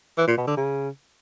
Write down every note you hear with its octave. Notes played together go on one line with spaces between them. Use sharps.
E3
A#2
B2
D3
C#3